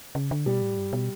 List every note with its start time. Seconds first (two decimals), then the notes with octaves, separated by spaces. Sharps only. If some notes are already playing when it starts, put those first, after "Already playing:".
0.15 C#3
0.31 D3
0.46 B2 G3
0.62 A2
0.78 G2
0.93 B2